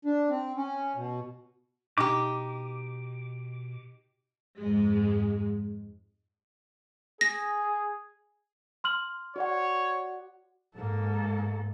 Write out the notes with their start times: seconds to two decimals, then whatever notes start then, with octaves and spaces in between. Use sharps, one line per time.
0.05 D4
0.30 C4
0.57 C#4
0.96 B2
1.98 B2 D#4 G4 D6
4.59 F2 G#2 G#3
7.21 G#4 A#6
8.84 C6 F6 F#7
9.36 F#4 C#5 D5 F#5
10.75 G#2 A#3 A4